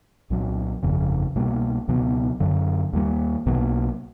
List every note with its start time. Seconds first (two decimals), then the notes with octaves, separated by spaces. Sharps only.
0.30 C2 A#2 F#3
0.83 G1 F2 C#3
1.35 C2 B2 G3 A#3
1.88 C#2 B2 F#3 B3
2.40 F#2 D3 F#3
2.93 D#2 D#3 G3 A#3
3.46 B1 B2 F#3 A#3